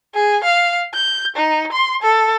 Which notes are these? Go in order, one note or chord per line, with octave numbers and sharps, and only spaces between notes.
G#4
F5
G6
D#4
C6
A4